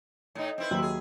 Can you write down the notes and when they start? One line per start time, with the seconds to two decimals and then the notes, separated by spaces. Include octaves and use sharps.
0.35 A2 D#4
0.58 C4 E4 B4
0.71 D#2 F#3
0.82 G#4